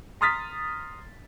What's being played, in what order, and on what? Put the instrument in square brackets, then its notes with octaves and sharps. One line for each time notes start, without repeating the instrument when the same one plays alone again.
[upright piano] A#5 C6 D#6 F6 A6 B6